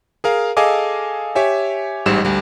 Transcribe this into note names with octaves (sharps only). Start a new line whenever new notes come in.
G#4 A#4 F5
G#4 A4 D#5 F5 G#5 D6
G4 C#5 E5 G#5
A1 G#2 G3 E7
D2 G3